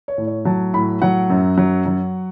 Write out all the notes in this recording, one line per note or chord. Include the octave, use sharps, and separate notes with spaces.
C#5
A2
C#5
F#3 A5
A2 B5
F#3 F#5
F#2
F#3
F#3